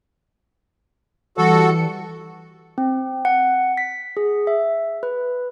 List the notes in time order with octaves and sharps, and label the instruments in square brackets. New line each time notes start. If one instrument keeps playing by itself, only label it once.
[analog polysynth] E3 G3 C#7 [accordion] F#4 A4
[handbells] C4
F#5
B6
G#4
E5
B4